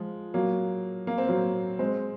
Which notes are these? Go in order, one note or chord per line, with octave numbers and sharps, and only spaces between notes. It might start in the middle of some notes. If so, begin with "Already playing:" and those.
Already playing: F3 G#3
F#3 A#3
A#3
C4
F#3 A#3
G#3 C4